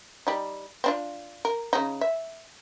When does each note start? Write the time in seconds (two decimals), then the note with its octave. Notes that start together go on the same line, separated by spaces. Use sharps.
0.27 G3 D#4
0.84 C4 D4 F4
1.45 A#4
1.73 C#3 D#4
2.01 E5